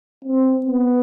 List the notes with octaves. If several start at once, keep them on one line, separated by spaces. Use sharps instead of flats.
C4
B3